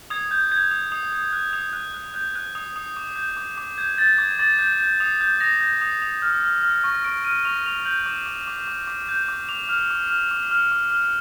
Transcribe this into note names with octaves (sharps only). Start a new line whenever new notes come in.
D#6 G#6
G6
G6 G#6
D#6
D#6
D#6
F#6
D#6
F#6
F#6
F#6 G6
F#6
D#6
D#6
D6
G6
D6
D6
G6 G#6
G6 A6
D6 G#6
D6 A6
G6
G6
D#6
G6
D#6 A#6
G6
D#6
D#6
F6
F6
F6
C#6
C#6 D7
F6 D#7
C#6 F7
C#6 F7
G6 F#7
D6
D6
D6
D6
D6
G6
D6
D6 F7
F6
D6
F6
D6
F6
D6
F6